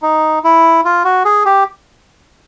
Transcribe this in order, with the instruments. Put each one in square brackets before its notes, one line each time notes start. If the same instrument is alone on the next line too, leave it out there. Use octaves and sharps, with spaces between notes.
[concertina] D#4
E4
F4
F#4
G#4
G4